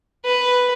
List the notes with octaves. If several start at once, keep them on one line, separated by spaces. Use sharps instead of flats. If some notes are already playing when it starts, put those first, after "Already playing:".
B4